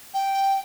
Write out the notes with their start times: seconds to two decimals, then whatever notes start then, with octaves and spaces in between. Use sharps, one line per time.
0.14 G5